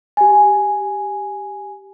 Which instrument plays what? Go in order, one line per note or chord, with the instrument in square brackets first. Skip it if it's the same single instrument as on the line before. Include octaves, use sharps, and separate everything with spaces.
[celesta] G4 G#5